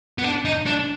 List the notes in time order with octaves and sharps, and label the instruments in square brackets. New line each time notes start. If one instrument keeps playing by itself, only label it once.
[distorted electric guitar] B3
D4
D#4
D4